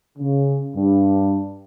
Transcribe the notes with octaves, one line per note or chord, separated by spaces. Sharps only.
C#3
G2